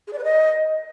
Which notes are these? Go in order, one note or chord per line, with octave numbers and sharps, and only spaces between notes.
G#4
D5
B4
D#5